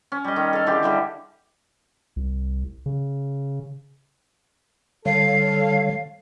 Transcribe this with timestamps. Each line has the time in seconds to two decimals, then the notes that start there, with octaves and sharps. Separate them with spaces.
0.12 C#4
0.25 G3 D#5
0.36 D#3
0.53 A4 F5
0.66 D3 E3 G4 G#4
0.83 D3 E3 G3
2.16 C2
2.86 C#3
5.06 D3 G3 A4 C#5 F5